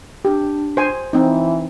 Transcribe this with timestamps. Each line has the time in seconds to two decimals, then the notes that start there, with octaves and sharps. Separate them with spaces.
0.25 D4 G4
0.77 C5 G#5
1.13 E3 C4 D#4